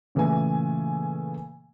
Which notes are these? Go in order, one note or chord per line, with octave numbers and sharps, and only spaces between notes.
A#2 C#3 E3 A3 E5 G#5